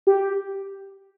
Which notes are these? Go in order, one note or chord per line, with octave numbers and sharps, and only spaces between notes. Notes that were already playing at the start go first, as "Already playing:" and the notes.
G4